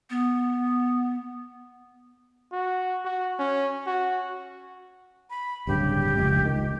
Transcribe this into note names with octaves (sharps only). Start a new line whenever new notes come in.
B3
F#4
F#4
C#4
F#4
B5
D1 G2 C#3 G4
F1 C#2
C#2 D#3